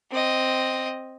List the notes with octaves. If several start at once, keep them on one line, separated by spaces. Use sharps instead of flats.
C4 D#5